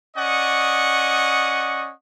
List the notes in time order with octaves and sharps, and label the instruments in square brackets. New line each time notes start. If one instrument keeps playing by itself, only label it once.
[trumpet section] C#4 D5 D#5 F#5 C#6 D#6